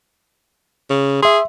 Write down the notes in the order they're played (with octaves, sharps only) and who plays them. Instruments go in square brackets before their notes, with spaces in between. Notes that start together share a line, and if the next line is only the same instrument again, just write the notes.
[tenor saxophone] C#3
[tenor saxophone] G#4 [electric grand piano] E5 C6